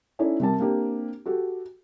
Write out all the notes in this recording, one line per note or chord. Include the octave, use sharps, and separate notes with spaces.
C#4 D#4 E4 A4 D5
C3 G3 A#4 A5
A#3 C4 D4 G4
F#4 G4 A4